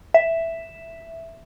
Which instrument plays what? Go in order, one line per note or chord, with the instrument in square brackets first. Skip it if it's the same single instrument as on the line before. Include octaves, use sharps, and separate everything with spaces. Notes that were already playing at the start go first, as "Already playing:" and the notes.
[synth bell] E5